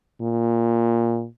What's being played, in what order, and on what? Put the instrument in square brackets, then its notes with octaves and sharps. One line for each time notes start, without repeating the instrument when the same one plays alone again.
[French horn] A#2